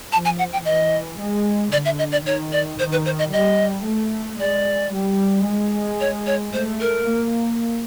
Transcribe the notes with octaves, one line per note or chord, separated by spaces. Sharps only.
F3 A5
G#5
F#5
G5
E3 D#5
G#3
D3 D5
E5
D#5
D5
D#3 C#5
D5
D#3 C5
B4
C5
D#5
G3 D#5
A3
G#3 D5
G3
G#3
C#5
C#5
A3 C5
A#4
A#3